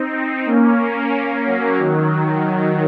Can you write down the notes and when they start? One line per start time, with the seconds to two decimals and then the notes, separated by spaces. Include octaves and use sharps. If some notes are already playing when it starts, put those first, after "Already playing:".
Already playing: C4 D#4
0.46 A#3 C#4
1.45 F#3 A#3
1.78 D#3 F#3
2.11 D#3 F#3